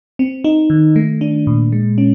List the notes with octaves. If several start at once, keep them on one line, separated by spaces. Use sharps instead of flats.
C4
D#4
D#3
A3
D4
A#2
G#3
C#4